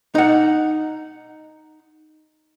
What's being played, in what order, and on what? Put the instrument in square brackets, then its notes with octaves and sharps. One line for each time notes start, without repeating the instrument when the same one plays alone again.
[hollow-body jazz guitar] D#4 F#5